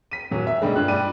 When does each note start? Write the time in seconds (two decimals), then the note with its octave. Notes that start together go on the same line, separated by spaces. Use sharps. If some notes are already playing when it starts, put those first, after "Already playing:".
0.11 B6 D#7
0.31 D#1 F#3
0.47 E5
0.62 B1 D3 G3 G#3
0.76 G2 F4 F#6
0.88 G3 D6 D#7